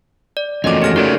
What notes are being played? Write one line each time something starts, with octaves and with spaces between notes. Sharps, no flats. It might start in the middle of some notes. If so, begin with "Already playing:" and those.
D5
E2 F3 A3 A#3 C#4 F#4 D#5 D6
G4 F6 A#6
D#4 F4 G4 G#4 A#4 D5